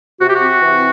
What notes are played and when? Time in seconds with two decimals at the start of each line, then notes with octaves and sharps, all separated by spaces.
0.20 C3 F#4
0.27 G4
0.35 C4 F#4
0.60 E3